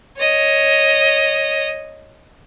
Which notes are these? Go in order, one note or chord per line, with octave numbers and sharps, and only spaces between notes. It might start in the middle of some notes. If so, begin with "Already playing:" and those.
C#5 D#5